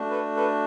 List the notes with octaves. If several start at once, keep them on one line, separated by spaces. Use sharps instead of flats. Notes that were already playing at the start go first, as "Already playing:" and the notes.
Already playing: A3 D4 F#4
A4 B4
A4 B4